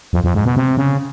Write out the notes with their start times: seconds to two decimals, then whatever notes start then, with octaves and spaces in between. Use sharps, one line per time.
0.13 F2
0.24 F2
0.35 G#2
0.45 B2
0.56 C3
0.77 C#3